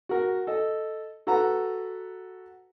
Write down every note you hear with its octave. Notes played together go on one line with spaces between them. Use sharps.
F#4 A#4
A4 D#5
F#4 A4 B4 F#5 A#5